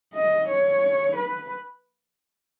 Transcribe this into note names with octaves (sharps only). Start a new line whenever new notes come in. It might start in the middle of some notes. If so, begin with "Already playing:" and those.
D#5
C#5
B4